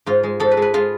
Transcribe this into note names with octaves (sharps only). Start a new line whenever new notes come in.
G#2 F4
G#3
G#2 A4
B4
G#3
B4
G#3 F4